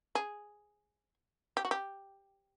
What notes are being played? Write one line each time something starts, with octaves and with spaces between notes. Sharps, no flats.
G#4
G4
F#4
G4